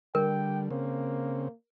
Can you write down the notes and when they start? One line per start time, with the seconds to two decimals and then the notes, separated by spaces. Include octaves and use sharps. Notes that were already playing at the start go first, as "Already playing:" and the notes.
0.15 D3 G3 A#4 G5
0.70 C#3 A#3 C4